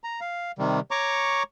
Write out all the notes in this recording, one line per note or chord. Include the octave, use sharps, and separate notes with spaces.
A#5
F5
C3 D#3 G3
C#5 A#5 C#6 D6